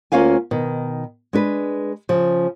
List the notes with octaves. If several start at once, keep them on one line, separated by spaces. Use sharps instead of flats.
D2 A#3 C#4 F4 F5 G#5
B2 D#3
G#3 D4 B4
C#3 F3